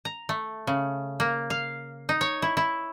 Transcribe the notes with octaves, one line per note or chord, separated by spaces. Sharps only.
A#5
A3
C#3
A#3
F5
D#4
C#5
E4
E4